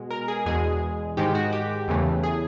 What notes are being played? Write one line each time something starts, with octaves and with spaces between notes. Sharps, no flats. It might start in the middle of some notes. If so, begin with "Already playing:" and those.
Already playing: B2 G#3
A#4
G#4
E2 B2 G#3 G#4
G#2 D#3 G#3 G4
F#4
G4
E2 C#3 E3 A3
G#4